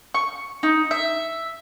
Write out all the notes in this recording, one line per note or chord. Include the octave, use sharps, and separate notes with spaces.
C#6
D#4
E5